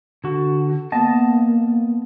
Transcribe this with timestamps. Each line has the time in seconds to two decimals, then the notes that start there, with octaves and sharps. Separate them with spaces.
0.24 D3 F#4
0.92 A#3 B3 D#5 A5